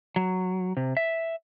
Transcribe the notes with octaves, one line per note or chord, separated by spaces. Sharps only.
F#3
C3
E5